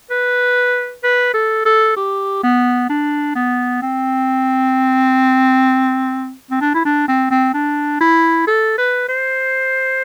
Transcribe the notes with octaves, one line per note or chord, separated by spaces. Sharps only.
B4
B4
A4
A4
G4
B3
D4
B3
C4
C4
D4
E4
D4
C4
C4
D4
E4
A4
B4
C5